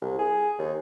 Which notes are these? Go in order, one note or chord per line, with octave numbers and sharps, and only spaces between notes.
C2
G#4
D#2